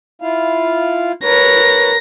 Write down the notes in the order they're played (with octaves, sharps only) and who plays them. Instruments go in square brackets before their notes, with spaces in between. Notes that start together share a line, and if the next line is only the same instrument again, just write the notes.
[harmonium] E4 F4 F5
[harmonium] A#4 [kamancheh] B4 C#5 [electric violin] A#6